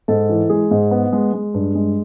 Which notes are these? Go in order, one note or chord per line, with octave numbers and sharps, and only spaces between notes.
G#2 A4
E3
G#3 G#4
G#2
B3
G#3
G#3
G2
G#3